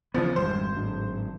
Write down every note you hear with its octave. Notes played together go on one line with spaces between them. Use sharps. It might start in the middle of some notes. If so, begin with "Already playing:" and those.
C#3 E3 F3 B3
G#1 F2 G3 C5
A2 F#3 D4